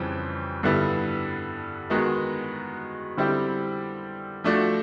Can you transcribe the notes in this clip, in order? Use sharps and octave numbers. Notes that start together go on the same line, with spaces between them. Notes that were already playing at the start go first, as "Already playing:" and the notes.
Already playing: F2 C#3 E3 G3 C4
G2 D3 G3 B3 E4
D#3 G#3 B3 D#4 F#4
D3 G3 C4 E4 G4
F3 A3 D4 F#4